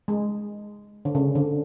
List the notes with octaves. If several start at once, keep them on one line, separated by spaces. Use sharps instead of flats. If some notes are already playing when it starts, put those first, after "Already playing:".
G#3
D3
C#3
D3